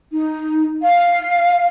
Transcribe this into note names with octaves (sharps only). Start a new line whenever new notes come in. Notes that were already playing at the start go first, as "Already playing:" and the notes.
D#4
F5